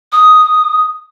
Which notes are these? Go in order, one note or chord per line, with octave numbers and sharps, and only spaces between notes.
D#6